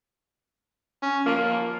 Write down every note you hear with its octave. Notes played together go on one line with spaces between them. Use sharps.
C#4
F3 A#3